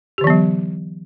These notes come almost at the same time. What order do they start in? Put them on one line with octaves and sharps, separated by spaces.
G4 D3 E3 B3 F#3